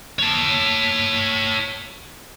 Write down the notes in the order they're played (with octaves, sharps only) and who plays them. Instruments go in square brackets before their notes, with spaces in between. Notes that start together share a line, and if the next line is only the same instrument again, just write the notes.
[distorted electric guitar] C#5 A5